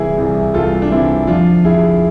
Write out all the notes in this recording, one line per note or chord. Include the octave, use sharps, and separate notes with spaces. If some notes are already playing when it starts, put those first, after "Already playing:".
Already playing: C2 C3 E3 E4 G#4
C2 C3 E3
C2 C3 E3 F4 A4
D4
C2 C3 E3 C4 E4
F2 D3 F3 D4 F4
F2 D3 F3 E4 G#4